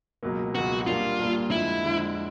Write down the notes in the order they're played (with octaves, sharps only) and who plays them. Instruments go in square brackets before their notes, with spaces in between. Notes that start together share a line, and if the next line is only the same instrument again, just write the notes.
[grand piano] C#2 B2 F#3 A#3
[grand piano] C#2 B2 F#3 A#3 [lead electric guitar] F#4
[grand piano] A#2 G3 A#3 D4 [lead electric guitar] F4
[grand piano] A#2 G3 A#3 D4
[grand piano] F2 D3 F3 G#3 [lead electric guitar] E4
[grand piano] F2 D3 F3 G#3